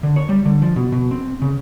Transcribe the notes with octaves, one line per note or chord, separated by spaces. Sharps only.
D3
C#5
G3
D3
F3
B2
B2
C4
C#3